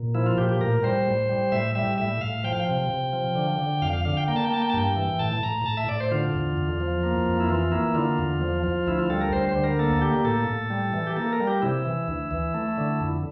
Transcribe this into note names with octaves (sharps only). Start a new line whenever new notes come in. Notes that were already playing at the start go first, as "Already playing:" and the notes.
Already playing: A#2
F3 E4
F4
A#2 G4
G4
A2 A#4
G3 C5
A2
G3
A2 E5
G3 E5
A2 E5
A2 F5
F3 G5
F5
G5
C3
C3
F3
D3
D3
F2 F5
F5
D3 F5
G5
A#3 G5
A5
G5
A#3 A5
G5
A5
G2 G5
E3
A2 A5
A2 A#5
A2 A5
E5
A2 D5
C5
D3 F4
E2
E2
F3
A#3
F2
E4
E3 F4
A#3 E4
D3 F4
E2
F3
F3
D2 E4
F4
G3 A4
A#4
D2 C5
C5
D3
A#4
A#3 A4
A#3 G4
A2 A4
A2
G3
E3
G4
A#3 A4
A#4
G3
G4
C3 E4
E3
D2
E3
A3
D3
F2